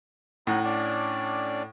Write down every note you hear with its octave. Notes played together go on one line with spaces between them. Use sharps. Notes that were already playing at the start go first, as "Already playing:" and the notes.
A2 C#4 D#4 D#5 F#5
C#4 D4 D5